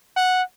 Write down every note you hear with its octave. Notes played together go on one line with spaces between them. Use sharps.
F#5